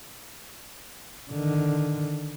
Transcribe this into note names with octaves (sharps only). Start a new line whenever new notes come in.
D3 D#3